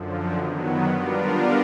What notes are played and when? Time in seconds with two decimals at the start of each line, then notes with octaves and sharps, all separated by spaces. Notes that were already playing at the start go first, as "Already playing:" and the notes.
Already playing: F#2 D3 F3
0.34 D#3 F#3 B3
0.86 G3 B3 D4 F4 A#4